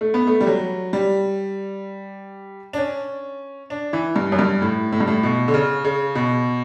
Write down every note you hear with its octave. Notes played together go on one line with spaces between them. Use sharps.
A3
B3
A3
G3
F#3
G3
D4
C#4
D4
E3
G2
F#2
G2
A2
A2
G2
A2
B2
D3
C#3
C#3
B2